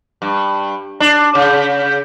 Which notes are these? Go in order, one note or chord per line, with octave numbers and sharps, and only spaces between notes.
G2
D4
C#3